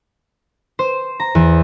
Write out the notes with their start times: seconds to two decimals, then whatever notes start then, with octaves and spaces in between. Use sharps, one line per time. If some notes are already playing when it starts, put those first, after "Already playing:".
0.79 C5
1.20 A#5
1.35 E2